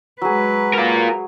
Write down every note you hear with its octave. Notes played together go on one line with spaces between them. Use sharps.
F#3 G#3 G#4 B4
F4 A#4